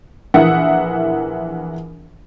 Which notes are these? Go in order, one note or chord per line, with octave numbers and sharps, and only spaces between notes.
A#1 E3 A#4 E5 F#5 D#6